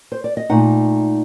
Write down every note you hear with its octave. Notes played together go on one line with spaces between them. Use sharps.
C5
D5
D#5
A#2 A3 D#4 F#5